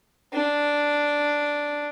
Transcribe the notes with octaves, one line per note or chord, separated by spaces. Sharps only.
D4